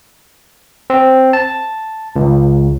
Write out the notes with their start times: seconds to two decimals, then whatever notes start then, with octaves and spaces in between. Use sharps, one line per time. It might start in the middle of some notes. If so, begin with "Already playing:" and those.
0.90 C4
1.33 A5
2.16 C#2